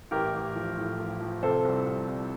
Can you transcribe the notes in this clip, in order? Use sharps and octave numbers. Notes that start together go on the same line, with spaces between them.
A1 G4 A#4
A1
F3
A2
F3
F3
C3 A4 C5
C2
C2
C2